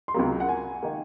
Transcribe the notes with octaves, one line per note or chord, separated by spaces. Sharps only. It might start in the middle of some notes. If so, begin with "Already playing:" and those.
C6
C#2 C3 F#3 A#3 A#5
F#5
G#5
D#3 A#3